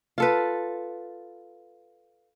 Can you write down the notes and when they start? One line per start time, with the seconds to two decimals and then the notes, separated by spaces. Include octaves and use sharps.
0.18 F4 A4 B4